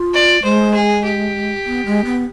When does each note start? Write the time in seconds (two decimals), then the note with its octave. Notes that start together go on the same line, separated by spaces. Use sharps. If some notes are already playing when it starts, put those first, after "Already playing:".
Already playing: F4
0.14 D5
0.43 G#3 C5
0.74 G#4
1.04 G4
1.66 B3
1.86 G#3
2.05 B3